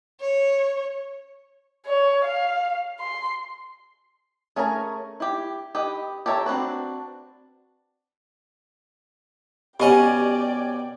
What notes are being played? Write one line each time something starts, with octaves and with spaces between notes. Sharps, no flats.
C#5
C#5
F5
C6
A3 C#4 G#4 A#4 A#5
E4 G4
G4 B4 D#5
G4 A4 C#5 E5 A#5
C4 D4 F#4 B4
B2 G3 C#4 G4 D5 D#5 F#5 G5